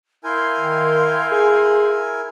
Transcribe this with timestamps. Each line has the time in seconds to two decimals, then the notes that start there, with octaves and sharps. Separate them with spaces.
0.24 E4 A#4 F5 G#5 C6 G6
0.60 D#3
1.32 G#4